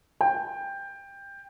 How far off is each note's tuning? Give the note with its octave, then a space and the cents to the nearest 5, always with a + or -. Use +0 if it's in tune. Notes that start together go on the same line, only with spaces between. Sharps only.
G5 +15